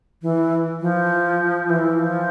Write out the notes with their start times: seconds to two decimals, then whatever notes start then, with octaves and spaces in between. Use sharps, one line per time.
0.22 E3
0.81 F3
1.70 E3
1.99 F3